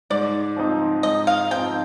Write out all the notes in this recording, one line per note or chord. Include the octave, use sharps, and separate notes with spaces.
G#2 D5
F3 C4 D#4
G#2 D#5
F5
F3 C4 D#4 G5